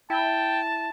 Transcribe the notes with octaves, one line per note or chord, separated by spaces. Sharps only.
E4 G5 A5